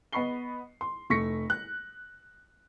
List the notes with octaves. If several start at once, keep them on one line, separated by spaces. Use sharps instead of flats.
B3 D#5 B5 C#6 C7 G7
C6
F1 A3 C#6 A#6 B6 C#7
F#6